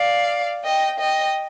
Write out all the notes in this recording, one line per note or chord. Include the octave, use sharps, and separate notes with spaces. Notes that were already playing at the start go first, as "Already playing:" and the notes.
Already playing: D5 F5
D#5 G5
D#5 G5